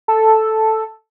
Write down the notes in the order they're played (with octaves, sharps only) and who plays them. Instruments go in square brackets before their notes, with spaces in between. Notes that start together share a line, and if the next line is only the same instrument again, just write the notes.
[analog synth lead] A4